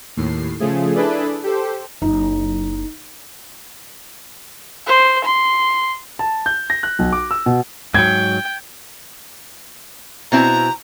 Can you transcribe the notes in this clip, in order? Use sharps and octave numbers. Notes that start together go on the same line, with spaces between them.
D#2 A2 C7
C#3 F3 A3 G#4
D4 E4 G#4 A4 B4 D5
G4 A4 C5
F#1 F#2 D#4
C5
C6
A5
G6
A#6
F#6
B1
D6
E6
B2
G#2 F#3 G5 G#6
B2 C4 E4 A#5